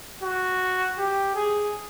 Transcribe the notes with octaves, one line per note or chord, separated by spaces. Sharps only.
F#4
G4
G#4